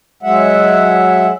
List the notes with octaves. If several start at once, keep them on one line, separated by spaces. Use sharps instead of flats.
F#3 G#3 E5 F#5